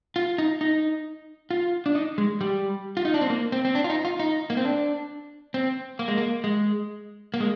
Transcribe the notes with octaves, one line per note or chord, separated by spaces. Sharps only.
F4
D#4
D#4
F4
D4
D#4
G#3
G3
F4
D#4
D4
C4
A#3
C4
C4
D4
F4
D#4
F4
D#4
A#3
C4
D4
C4
A#3
G#3
A#3
G#3
A#3
G#3